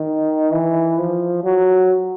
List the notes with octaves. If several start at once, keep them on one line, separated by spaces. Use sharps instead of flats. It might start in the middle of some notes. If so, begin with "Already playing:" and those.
Already playing: D#3
E3
F3
F#3